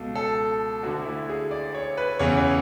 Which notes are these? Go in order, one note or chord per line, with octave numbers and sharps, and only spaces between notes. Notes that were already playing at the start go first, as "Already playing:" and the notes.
Already playing: C#2 B2 A4
A4
D2 D3 F#4
E4
G#4
D5
C#5
B4
E2 C#3 E3 C#5
C#5